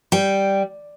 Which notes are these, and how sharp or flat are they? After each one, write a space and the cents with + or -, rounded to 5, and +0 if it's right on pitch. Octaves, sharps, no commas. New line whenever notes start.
G3 +0 G5 -5